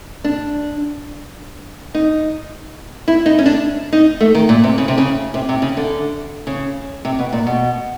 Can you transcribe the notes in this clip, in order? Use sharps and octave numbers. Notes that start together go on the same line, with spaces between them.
D4
D#4
E4
D#4
C#4
D4
D#4
A3
D#3
A#2
C3
C#3
C3
C#3
C3
C3
C#3
D3
C#3
C3
B2
A#2
B2